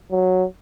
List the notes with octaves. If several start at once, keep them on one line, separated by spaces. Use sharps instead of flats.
F#3